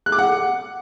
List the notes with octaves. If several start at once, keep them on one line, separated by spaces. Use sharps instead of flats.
F#6
D6
F#5